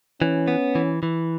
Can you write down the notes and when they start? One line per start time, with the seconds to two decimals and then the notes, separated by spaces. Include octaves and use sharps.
0.22 E3 C#4
0.48 B3
0.75 E3
1.03 E3